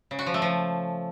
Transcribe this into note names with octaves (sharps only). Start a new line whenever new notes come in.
C#3
F#4
F3
A3
F3